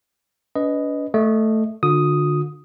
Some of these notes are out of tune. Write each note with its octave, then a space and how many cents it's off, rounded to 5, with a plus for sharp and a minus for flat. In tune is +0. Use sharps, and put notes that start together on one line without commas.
D4 -45 B4 +5 D#5 +0
A3 +0 D#5 -15
D3 +15 F4 +45 D#6 +0